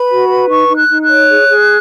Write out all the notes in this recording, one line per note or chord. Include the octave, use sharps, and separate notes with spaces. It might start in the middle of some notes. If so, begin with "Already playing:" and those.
Already playing: B4 B5
F#4
B4
D#4 C#6
D#4
F#6
D#4
F#6
C#5
G#4
G#4